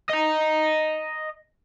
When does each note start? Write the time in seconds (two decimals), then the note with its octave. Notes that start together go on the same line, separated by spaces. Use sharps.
0.09 D#5 A#5